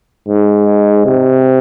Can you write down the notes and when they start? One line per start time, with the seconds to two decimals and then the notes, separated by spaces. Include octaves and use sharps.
0.29 G#2
1.06 C3